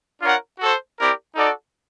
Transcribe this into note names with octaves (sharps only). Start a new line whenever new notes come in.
D4 F4 A#4 C#5 F#5
F#4 A4 C5
C4 E4 G4 A#4 D5
D#4 F#4 A4 D5